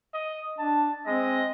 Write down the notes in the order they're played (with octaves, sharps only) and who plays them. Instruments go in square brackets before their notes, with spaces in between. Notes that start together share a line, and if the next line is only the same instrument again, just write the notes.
[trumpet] D#5
[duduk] D4 [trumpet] A5
[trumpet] G#3 [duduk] C4 [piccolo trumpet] D#5